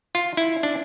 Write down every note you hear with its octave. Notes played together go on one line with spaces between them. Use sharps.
F4
E4
D4